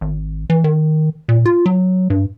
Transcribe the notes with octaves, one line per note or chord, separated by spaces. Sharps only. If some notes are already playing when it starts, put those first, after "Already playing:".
G#1
E3
D#3
A#2
F4
F#3
G2